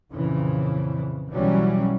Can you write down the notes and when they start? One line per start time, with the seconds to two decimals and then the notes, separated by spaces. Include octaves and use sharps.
0.13 F2 A#2 C#3 E3
1.30 B1 E3 F#3 G3 C#4